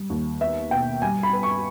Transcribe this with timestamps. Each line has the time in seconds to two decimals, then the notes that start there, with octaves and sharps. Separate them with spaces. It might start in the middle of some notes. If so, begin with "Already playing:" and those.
Already playing: G3
0.10 D#2
0.40 B3 E5
0.71 B2 G5
1.02 G3 G#5
1.23 B5
1.33 B3
1.43 C#6